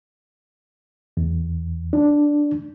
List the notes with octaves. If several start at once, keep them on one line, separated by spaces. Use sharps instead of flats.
E2
D4